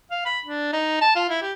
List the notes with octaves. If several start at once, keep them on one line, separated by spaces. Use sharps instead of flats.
F5
B5
D4
D#4
A5
F4
E4
G4